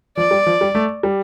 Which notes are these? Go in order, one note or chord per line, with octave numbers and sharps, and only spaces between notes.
F3 D5
G3
F3
G3
A3
G3